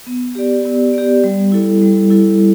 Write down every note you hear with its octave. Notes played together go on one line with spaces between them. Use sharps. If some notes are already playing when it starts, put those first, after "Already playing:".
B3
G4 D5
B3
G4 D5
G3
E4 A4
G3
E4 A4